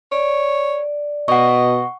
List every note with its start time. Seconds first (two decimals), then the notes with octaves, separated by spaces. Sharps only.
0.12 C#5 D5
1.28 B2 D#5 F#5 C#6